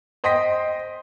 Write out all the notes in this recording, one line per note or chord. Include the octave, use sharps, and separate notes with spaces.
C5 D#5 G5 C6 A#6 B6